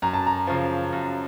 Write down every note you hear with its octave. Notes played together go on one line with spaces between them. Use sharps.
F#2 A#5
A5
A#5
C#3 F3
F#2